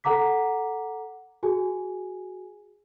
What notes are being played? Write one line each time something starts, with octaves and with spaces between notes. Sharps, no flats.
A4 F#5 A#5 D6 B6
F#4 G#4 G#5